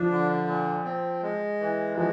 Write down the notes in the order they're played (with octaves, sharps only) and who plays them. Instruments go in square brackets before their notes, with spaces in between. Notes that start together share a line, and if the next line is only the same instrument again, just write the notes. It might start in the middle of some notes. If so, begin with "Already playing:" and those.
Already playing: [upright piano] F3 [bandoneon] D4
[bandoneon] D3
A#2
C4
G#3
E3
[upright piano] F3 [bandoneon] G#3